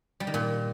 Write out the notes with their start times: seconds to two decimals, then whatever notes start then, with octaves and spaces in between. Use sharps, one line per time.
0.20 G3
0.27 D#3
0.34 A#2